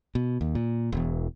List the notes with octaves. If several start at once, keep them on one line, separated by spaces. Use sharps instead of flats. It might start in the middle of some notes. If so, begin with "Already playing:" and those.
B2
D#2
A#2
E1 E2